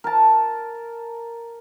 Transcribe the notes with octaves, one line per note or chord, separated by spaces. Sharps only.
A#4 A5